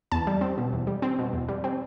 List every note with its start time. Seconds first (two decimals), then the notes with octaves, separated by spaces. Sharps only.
0.12 E2 A5
0.27 G3
0.41 C4
0.58 B2
0.73 E2
0.87 G3
1.02 C4
1.19 B2
1.33 E2
1.49 G3
1.64 C4